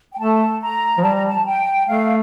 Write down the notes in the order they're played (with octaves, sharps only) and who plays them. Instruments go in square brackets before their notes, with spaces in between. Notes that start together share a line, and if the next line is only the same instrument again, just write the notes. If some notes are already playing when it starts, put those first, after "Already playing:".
[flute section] G5
[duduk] A3 [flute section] A5
[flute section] A#5
[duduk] F3
[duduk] G3 [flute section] A5
[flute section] A#5
A5
G5
[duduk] A3 [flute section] F5